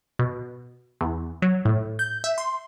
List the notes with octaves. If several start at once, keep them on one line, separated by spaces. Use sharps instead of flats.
B2
E2
F#3
A2
G6
E5
C6